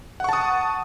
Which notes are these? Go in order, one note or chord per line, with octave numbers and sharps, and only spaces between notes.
F#5 A5 C#6 D#6